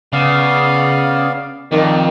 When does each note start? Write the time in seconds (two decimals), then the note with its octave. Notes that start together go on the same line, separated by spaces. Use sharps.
0.13 C#3 B3 D5 F5
1.72 F2 D#3 D5